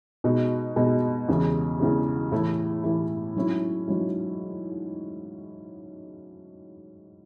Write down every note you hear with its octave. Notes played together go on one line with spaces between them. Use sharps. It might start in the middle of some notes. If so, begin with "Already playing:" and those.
B2 G#3 D#4
B2 G#3 D#4
E2 C#3 E3 G#3
E2 C#3 E3 G#3
A2 E3 A3 E4
A2 E3 A3 E4
G#2 F#3 C#4 E4
G#2 F#3 C#4 E4